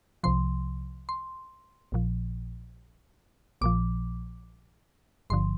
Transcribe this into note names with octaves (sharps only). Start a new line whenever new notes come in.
C2 C3 F3 C6
C6
A#1 A#2 F3
A#1 A#2 F3 D6
G1 G2 D3 F3 C6